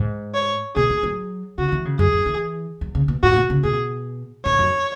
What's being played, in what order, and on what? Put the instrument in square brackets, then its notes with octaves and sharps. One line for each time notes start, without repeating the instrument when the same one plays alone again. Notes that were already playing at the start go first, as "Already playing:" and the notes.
Already playing: [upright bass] G#2
[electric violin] C#5
[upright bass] B2 [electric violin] G#4
[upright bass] F#3
F#3
[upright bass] C#3 [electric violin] F#4
[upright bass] E3
C#3
[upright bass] F#2 [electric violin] G#4
[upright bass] F#2
E3
F#3
C#3
B2
[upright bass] G#2 [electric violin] F#4
[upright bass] B2
C#3
[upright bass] B2 [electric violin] G#4
[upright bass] G#2 [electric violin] C#5
[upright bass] F#2